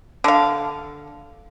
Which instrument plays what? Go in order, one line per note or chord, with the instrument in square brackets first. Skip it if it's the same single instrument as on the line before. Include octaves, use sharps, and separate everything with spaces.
[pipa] D3 F5